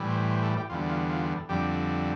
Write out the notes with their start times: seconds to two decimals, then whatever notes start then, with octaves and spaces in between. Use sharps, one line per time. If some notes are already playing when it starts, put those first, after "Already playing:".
Already playing: A2 E3 G3
0.10 C5
0.31 C5
0.43 A4
0.57 G4
0.70 E2 D3 G3 F4
0.89 F4
1.10 F4
1.49 F2 D3 G3 G4